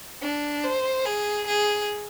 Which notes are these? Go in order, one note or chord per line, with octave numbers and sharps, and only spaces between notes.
D4
C5
G#4
G#4